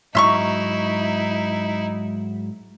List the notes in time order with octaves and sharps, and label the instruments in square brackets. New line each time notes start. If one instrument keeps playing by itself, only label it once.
[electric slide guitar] G#2 F#3 A#5 [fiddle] D#4 E4 [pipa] E5 C6 C#6